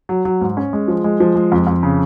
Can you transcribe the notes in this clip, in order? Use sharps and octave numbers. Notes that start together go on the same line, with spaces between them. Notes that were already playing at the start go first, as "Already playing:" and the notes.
F#3
F#3
G#2
C#4
G#3
F3
G#3
F3
G#3
F2
F2
C#3